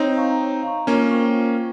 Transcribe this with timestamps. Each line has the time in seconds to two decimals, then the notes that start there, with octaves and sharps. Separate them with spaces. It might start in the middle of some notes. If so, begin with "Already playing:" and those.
Already playing: C4 D#4 C#5
0.17 F5 A#5 C#6
0.41 C#5
0.63 F5 A#5 C#6
0.87 A#3 C#4 F4
1.11 C5 G5 C#6
1.35 F4